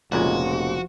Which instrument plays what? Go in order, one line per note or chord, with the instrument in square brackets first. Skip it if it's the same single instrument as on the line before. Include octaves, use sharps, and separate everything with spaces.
[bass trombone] F1 [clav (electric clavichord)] C#2 A#2 G#3 [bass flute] F3 [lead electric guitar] F#4